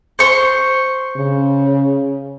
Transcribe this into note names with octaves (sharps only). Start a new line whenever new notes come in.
C5 C#6
C#3